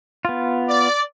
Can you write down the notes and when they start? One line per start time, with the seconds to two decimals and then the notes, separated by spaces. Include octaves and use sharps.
0.25 B3 F4
0.69 D5